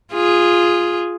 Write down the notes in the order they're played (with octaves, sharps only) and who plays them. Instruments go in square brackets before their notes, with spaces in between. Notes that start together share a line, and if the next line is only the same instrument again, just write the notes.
[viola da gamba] F4 G#4